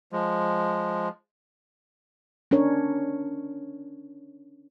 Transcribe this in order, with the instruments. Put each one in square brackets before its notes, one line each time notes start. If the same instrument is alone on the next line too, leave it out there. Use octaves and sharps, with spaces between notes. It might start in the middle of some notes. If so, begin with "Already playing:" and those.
[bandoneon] F3 G#3
[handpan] C#4 D4 A#4 C#5